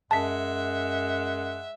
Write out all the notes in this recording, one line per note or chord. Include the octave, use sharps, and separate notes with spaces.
F#2 G#3 E5 F#5 A5 B6